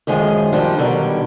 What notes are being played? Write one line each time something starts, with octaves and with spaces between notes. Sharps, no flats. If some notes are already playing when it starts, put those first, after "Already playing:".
F#2 D#3 F3 G#3 G#4
D#3 F3 G3 D4
B2 D3 D#3 F#3 G3